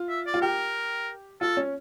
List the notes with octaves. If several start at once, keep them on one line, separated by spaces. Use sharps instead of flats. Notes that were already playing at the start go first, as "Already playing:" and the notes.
Already playing: F4
E5
D5
F4
G4 A#4
F4 A4
C#4